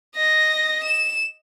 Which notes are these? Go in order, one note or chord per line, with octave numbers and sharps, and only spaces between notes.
D#5 A#6
E7